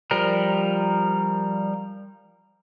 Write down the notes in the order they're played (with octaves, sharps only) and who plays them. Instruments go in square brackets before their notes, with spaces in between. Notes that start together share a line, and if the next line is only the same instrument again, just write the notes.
[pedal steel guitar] F3 G3 A#4